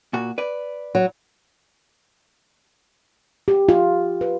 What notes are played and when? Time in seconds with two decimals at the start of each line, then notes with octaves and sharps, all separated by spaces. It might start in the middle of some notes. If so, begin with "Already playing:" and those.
0.13 A#2 F#4
0.38 B4 D5
0.95 F#3
3.48 G4
3.69 F4
4.21 B4